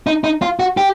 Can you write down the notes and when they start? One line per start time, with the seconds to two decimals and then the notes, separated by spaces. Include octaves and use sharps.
0.07 D#4
0.24 D#4
0.42 F4
0.59 F#4
0.77 G4